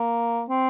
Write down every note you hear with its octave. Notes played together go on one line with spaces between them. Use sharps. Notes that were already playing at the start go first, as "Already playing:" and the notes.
Already playing: A#3
C4